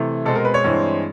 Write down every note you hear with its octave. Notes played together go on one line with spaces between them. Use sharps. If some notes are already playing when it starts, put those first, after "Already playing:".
Already playing: C3 E3 A3
B2 G#3 C4 A4
A#4
B4
C#5
G2 E3 G#3 C4